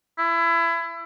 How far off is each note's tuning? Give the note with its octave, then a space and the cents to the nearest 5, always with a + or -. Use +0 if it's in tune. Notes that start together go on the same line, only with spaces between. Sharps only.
E4 +25